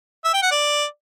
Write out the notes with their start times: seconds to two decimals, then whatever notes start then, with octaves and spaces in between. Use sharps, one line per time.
0.25 E5
0.34 G5
0.42 F#5
0.51 D5